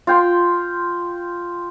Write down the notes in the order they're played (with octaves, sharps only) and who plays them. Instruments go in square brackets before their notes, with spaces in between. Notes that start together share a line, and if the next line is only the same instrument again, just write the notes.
[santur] F4 G5 C6